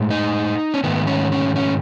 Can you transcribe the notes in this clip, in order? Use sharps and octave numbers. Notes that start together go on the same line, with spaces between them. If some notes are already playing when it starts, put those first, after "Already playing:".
Already playing: A2 G#3
D#4
C#4
G#2 D#3 A3 B3
C#4
C#4
C#4